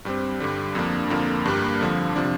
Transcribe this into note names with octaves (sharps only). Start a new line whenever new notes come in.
G2 G3 C4
G2 D3 G3
F2 F3 A#3 D4
F2 D3 F3 A#3
G2 G3 A#3
F2 D3 F3
C3 F3 D4